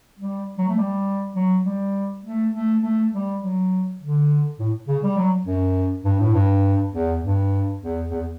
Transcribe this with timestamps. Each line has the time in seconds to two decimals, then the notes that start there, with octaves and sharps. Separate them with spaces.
0.19 G3
0.58 F#3
0.68 A3
0.78 G3
1.36 F#3
1.65 G3
2.25 A3
2.53 A3
2.83 A3
3.13 G3
3.41 F#3
4.00 D3
4.59 A2
4.88 C#3
5.03 G3
5.17 F#3
5.46 F#2
6.04 G2
6.20 A2
6.33 G2
6.92 E2
7.22 G2
7.81 E2
8.10 E2